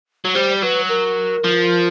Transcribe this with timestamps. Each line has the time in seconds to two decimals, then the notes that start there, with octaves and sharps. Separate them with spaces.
0.25 F#3
0.34 G3 C5
0.62 F#3 B4
0.89 A#4
1.44 F3